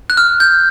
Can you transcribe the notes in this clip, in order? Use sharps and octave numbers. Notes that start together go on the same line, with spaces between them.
F#6
F6
G6